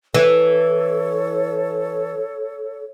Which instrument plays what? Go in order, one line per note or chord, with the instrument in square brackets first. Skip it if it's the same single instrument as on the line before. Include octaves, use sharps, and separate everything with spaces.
[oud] E3 [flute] A4 [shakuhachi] C#5